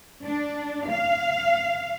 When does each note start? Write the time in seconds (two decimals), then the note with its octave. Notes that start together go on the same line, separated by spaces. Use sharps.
0.24 D4
0.89 F5